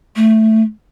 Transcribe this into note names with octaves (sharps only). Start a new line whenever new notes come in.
A3